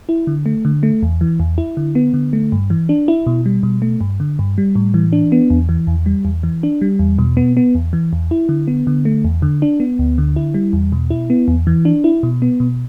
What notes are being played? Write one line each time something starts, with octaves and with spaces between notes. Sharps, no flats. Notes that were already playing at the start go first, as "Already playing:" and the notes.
E4
D3
A3
D3
A3
E2
E3
E2
E4
D3
B3
D3
A3
G2
E3
D4
E4
B2
G3
B2
A3
G2
D3
G2
G3
A2
E3
D4
B3
E2
E3
E2
G3
E2
E3
D4
G3
E2
B2
B3
B3
E2
E3
E2
E4
D3
B3
D3
A3
E2
D3
D4
B3
D2
D3
E4
G3
E2
B2
E4
B3
E2
E3
D4
E4
B2
B3
B2